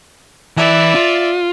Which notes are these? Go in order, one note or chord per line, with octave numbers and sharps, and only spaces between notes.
E3 D5 E5
F4